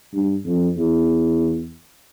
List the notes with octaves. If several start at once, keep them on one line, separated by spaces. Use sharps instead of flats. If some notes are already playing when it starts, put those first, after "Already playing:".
G2
F2
E2